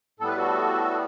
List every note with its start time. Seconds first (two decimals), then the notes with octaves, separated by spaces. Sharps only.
0.20 A2 G3 B3 A4
0.28 B4
0.37 F#4 A4